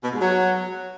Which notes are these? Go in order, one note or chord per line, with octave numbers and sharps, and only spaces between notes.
B2
G#2
F#3